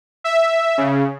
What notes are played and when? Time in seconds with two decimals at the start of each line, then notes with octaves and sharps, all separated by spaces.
0.24 E5
0.78 C#3